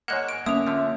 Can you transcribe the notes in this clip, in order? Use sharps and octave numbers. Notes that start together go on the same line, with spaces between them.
G#2 G#3 A#3 C#5 D#5 F#5 F#6 E7
D7
D3 A#3 C#4 E5 D#6 F7
D3 F3